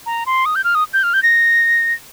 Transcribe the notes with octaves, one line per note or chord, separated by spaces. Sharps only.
A#5
C6
D#6
G6
F6
D#6
G6
F6
G6
A#6